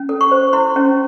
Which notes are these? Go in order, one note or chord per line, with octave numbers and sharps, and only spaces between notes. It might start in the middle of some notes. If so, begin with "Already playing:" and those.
Already playing: C#4
A4
C#6
C5
E4 C6
C#4